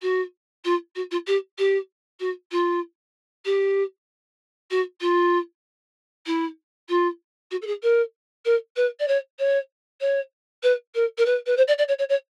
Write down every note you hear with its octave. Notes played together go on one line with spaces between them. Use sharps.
F#4
F4
F#4
F4
G4
G4
F#4
F4
G4
F#4
F4
E4
F4
F#4
A4
G#4
A#4
A#4
B4
D5
C#5
C#5
C#5
B4
A#4
A#4
B4
B4
C5
D5
D5
C#5
C#5
C#5